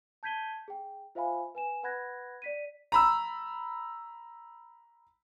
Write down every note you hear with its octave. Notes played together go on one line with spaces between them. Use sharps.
A5 G6 G#6 B6 D#7 G7
G#4 G5
F4 C5 E5 F5 G#5 B5
B4 G#5 E7
B4 F#5 B5 F#6 G#6 A#6
D5 B6 D#7
A#5 B5 E6